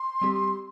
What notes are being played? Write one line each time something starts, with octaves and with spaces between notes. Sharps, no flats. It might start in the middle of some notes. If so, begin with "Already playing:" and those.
Already playing: C6
G3 C4 G4